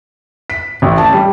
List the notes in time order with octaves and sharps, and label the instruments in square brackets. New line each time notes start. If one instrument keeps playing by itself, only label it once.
[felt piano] B6
A1
A5
G3